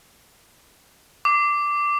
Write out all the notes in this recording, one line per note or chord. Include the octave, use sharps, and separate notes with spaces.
D6